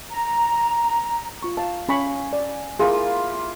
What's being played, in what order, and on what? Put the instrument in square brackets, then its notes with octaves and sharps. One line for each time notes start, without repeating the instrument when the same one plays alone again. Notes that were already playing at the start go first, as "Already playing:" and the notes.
[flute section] A#5
[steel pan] F4 C#6
[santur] F5 [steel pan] A5
[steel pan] C#4 B5 C#6 [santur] G#5
[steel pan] D5
[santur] A#3 E4 F4 [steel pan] G#4